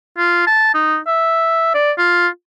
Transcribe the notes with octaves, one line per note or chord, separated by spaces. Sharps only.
F4
A5
D#4
E5
D5
F4